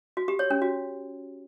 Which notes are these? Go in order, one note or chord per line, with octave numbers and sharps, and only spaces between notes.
F#4
G4
C#5
C#4
F#4